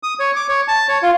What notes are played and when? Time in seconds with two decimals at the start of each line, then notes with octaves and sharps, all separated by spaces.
0.03 D#6
0.20 C#5
0.36 D6
0.49 C#5
0.68 A5
0.88 C#5
1.03 F4